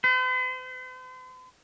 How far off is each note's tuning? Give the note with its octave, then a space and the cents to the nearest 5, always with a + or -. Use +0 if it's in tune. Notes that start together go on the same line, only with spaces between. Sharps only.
C5 -45